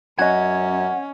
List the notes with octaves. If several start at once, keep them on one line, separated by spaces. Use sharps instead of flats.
F#2 C#4 D#5 F#5 G#6